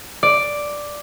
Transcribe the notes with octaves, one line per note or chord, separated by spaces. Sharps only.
D5